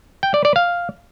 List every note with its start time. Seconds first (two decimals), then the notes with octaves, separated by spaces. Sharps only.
0.23 G5
0.34 D5
0.45 D5
0.56 F5